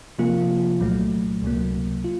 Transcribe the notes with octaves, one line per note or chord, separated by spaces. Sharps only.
C3 F3 A#3 F4
C2 A#2 F#3 A3
C#2 C3 F#3 A#3
F4